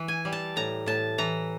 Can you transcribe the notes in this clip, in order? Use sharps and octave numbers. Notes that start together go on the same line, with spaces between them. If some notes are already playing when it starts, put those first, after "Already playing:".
Already playing: E3
G#5
G3
A5
A2 A#5
A2 A5
E3 A#5